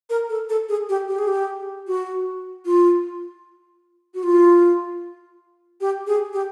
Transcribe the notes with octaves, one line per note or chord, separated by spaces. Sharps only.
A#4
A4
A4
G#4
G4
G4
G#4
G4
F#4
F4
F#4
F4
G4
G#4
G4